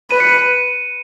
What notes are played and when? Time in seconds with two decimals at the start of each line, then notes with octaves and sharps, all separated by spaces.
0.11 B4 D#7
0.20 C#7
0.29 D#7